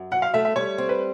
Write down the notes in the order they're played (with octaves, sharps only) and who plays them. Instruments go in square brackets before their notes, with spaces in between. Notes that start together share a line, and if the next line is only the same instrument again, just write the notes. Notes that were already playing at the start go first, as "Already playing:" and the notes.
Already playing: [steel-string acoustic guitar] F#2
[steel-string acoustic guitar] F#3 [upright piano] F#5
[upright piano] F5
[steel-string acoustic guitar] A3 [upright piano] E5
[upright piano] E5
[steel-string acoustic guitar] G3 [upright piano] C#5
[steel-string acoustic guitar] C4
[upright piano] B4